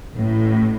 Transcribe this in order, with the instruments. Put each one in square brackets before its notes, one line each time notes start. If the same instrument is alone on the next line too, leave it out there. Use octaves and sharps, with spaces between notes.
[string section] A1 A2